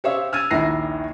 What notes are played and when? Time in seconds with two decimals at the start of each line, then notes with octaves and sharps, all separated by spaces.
0.04 G4 C5 C#5 E5 F5 E6
0.33 E6 F6 G#6 A6 D#7
0.51 A#1 D#2 D4 E4 A#6 C7